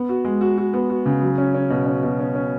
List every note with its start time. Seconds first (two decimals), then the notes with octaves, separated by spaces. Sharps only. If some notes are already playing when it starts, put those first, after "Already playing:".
Already playing: B3
0.09 F#4
0.25 G#3
0.41 F#4
0.58 F#4
0.74 B3
0.90 F#4
1.06 C#3
1.22 F#3
1.38 C#4
1.54 C#4
1.70 B2
1.86 C#4
2.03 B2
2.20 C#4
2.35 C#4